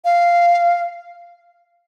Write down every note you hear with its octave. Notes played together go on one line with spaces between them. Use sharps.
F5